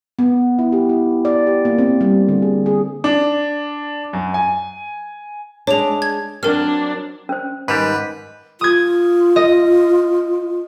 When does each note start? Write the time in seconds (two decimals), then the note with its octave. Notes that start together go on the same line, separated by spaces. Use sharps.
0.19 B3
0.59 E4
0.72 G4
0.89 E4
1.25 D5
1.47 G4
1.65 A#3
1.78 C4
2.01 G3
2.28 D3
2.42 G#4
2.66 G#4
3.04 D4
4.13 F#2
4.34 G#5
5.67 G#3 D4 C#5 F7
6.02 G#6
6.43 F#3 C4 D4 A#4 F6
7.29 C#4 C5
7.68 G#2 D#3 G3 B4
8.61 F4 D#6 G#6
9.36 D#5